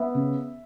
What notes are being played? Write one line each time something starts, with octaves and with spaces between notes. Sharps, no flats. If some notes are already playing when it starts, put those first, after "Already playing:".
Already playing: B3 E5
C#3